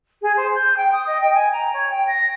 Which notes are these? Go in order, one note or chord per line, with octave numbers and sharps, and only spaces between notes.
G#4
C5
G6
G5
D#6
D#5
G5
G#5
A#5
C#5
G5
A#6